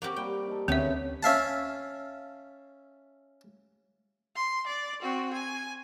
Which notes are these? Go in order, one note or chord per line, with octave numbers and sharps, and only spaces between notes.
A#3 C4 F#4 G4 D5
G3 A#3 G5
D#4 A4
D2 C#3 B3 C4 E5
C#4 E5 F5 A5
C6
D5
C4 F#4
G#5